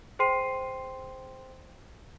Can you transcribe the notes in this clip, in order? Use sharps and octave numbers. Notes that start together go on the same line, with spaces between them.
G#4 C5 G5 C6 C7 D#7